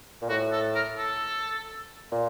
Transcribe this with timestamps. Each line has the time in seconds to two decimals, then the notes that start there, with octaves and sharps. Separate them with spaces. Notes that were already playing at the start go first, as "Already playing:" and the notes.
0.22 A#2
0.29 A2 F#4
0.52 A4
0.75 A#4
0.97 A4
2.12 A#2